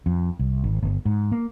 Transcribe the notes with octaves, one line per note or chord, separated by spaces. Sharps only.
F2
C2
G#1
G1
G#2
A#3